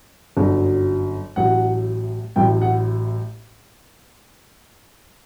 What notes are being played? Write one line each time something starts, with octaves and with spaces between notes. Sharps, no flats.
G1 F#2 F#3
A1 A2 F#3 F#5
A1 A2 F#3 G5
F#5